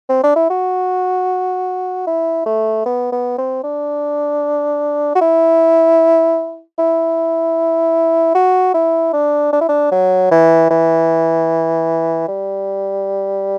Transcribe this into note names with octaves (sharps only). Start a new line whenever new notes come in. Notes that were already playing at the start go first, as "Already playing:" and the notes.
C4
D4
E4
F#4
E4
A3
B3
B3
C4
D4
F#4
E4
E4
F#4
E4
D4
D4
E4
D4
F#3
E3
E3
G3